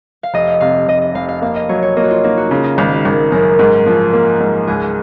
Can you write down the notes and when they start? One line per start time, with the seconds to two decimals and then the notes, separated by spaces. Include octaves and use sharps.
0.23 F5
0.34 F1 D#5
0.61 C3 F5
0.88 F1 D#5
1.01 D#5
1.15 F1 F5
1.29 F5
1.42 A#3 F5
1.56 D#5
1.69 F#3 C#5
1.82 C#5
1.97 A#3 D#5
2.03 F#4
2.10 F4
2.24 A#3 D#4
2.37 F#4
2.51 C#3 F4
2.64 D#4
2.78 G#1 D#4
2.92 F#4
3.05 G#1 A#4
3.32 F#2 A#4
3.59 G#2
3.86 F3
4.13 A#3
4.41 G#2
4.67 C#2 G#4